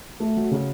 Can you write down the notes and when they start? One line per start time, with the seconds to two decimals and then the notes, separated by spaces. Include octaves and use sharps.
0.20 A3
0.37 F#3
0.51 C#3